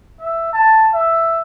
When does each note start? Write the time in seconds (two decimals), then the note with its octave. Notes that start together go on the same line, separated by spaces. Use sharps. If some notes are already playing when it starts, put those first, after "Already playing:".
0.20 E5
0.53 A5
0.93 E5